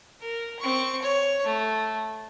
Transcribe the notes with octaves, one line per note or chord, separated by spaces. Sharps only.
A#4
C4 C#6
C#5
A3